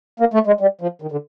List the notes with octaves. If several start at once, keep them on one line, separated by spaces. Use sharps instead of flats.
A#3
A3
G#3
G3
F3
D#3
D3